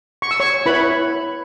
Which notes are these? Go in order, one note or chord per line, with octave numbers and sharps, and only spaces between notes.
C#6
E6
C#5 C#6
E4 B4 C#5 B5